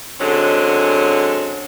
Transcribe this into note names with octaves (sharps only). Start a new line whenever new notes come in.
D3 F#3 G#3 C4 C#4